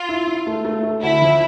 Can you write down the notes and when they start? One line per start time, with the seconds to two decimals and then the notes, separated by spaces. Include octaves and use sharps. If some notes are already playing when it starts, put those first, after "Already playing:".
Already playing: F4
0.09 E4
0.27 E4
0.47 A3
0.65 A3
0.83 A3
1.03 D2 E4
1.22 F3